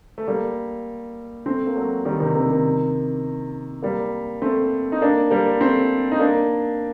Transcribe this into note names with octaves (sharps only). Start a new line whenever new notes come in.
A3
G3 A#3
A3 C4
A#3
F#3 A3
D#3 G3
C3 D#3
C3 D#3
C3 D#3
G3 A#3
A3 C4
D#4
A#3 D4
G3 A#3
A3 C4
D#4
A#3 D4